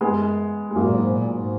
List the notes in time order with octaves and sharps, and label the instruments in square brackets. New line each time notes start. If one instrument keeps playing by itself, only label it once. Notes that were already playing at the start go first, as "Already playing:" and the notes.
[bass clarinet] F#2 [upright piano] G#3 B3
[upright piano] G#3
[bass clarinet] F#2 [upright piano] F#3 A#3
[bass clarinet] A#2
G#2
A#2
G#2